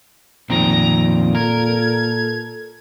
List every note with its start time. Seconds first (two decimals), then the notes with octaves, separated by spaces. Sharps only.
0.50 F2 A#2 D#3 C4 A#5
1.35 A4 A#4 G#6